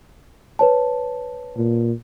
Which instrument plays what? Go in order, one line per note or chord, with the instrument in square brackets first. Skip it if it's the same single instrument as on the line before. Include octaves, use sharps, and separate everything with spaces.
[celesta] B4 C#5 A5
[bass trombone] A#2